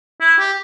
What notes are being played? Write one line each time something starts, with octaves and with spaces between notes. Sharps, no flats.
E4
G4